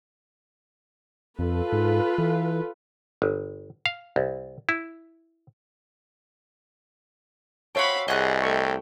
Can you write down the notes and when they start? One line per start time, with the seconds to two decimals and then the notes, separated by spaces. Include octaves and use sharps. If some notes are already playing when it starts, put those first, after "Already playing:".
1.39 F2 F4 A4 B4
1.72 G#2
2.18 E3
3.22 G1
3.86 F5
4.16 C2
4.69 E4
7.75 F#4 C5 C#5 E5 F5 G5 A5 B5
8.08 C2 G#4 D#5 F#5 G#5 F#6
8.43 A3 E5 G5 C#6